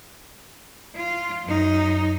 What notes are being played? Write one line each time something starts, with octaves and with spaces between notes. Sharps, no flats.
F4
F#2 D#4